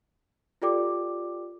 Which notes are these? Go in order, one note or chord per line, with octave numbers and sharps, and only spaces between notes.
F4 G4 A4 D5 G5 D6